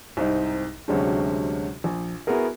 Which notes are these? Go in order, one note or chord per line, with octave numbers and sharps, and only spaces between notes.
C2 G#2 C4 D#4
D2 C3 F#3 G#3 C#4 D4
A#1
B3 E4 F#4 G#4 A#4